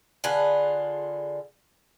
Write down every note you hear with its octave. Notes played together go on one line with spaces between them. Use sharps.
D3 F4 G#4 B4